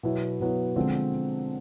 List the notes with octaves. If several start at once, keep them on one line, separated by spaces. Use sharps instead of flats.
B2 F#3 B3 E4
B2 F#3 B3 E4
D3 F3 G#3 C4